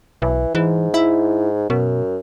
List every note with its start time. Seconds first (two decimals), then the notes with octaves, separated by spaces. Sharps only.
0.22 B1 E3
0.55 G#2 E3
0.94 E4
1.70 F#2 B2